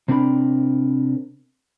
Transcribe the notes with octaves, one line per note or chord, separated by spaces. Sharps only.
C3 C4 D4 A#4 B5